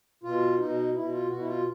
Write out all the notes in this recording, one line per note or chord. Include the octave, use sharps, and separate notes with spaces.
B2 F4
B2 D#4
B2 E4
F4
B2 F#4
E4
F4